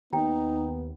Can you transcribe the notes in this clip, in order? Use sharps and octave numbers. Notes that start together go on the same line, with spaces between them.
D#2 B3 D#4 G5 A#5